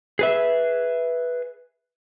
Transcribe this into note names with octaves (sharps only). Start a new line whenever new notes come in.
G#4 B4 E5